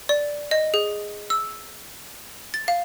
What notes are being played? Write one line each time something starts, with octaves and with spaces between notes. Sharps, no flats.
D5
D#5
G#4
E6
A6
F5